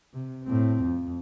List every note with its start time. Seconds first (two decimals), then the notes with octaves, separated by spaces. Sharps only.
0.14 C3
0.44 A2 C4
0.83 F2